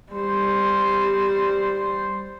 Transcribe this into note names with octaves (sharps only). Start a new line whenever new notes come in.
G3 C5